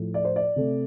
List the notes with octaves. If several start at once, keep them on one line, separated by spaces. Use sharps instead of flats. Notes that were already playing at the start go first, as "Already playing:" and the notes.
Already playing: A2 F3 A3
D5
C5
D5
C3 A3